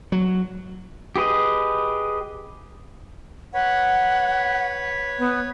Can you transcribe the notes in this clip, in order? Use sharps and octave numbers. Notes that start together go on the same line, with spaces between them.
F#3
G4 G#4 B4 D#5
B4 C#5 F#5
B3